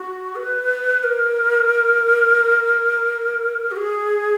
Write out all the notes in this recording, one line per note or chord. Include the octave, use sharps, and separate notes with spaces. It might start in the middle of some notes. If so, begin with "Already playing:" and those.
Already playing: F#4
B4
A#4
F#4
G#4